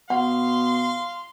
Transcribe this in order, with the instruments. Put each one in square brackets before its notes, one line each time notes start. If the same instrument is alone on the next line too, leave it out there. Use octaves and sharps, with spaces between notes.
[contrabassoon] B2 [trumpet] F5 [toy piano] F#5 [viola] C6